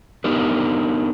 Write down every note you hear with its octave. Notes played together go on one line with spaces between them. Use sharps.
B3 D4 D#4 G4 A#4